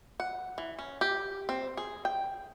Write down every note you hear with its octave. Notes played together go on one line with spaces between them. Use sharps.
F#5
E3
C#4
G4
C4
G#4
G5